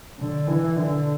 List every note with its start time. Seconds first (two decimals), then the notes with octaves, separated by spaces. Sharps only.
0.19 D3
0.47 E3
0.76 D3